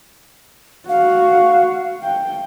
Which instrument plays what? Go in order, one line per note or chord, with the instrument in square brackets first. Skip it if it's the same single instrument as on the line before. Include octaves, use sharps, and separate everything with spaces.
[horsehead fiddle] F#4 [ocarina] F5
[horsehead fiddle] G5